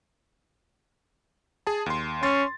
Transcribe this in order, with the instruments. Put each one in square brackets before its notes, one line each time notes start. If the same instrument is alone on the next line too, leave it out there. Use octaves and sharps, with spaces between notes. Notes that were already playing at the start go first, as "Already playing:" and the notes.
[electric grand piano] G#4 A5
D#2 C6
[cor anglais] C#4 [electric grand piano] C6 A6